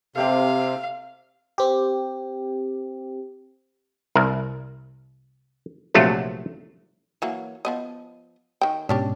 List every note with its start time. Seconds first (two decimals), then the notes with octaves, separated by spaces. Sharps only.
0.16 C3 C4 G4 A4 F5
1.58 C4 G4
4.15 C2 A#4
5.94 A#1 C3 F#3 A3 F4
7.22 E3 F#3 A#3
7.65 F3 B3 D#5
8.61 D#3 G5
8.89 G#2 B2 C#4 D4 G4